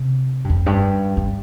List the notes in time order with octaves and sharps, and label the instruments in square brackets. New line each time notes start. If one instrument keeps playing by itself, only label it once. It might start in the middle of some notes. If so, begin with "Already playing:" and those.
Already playing: [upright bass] C3
G2
F2
G2
G2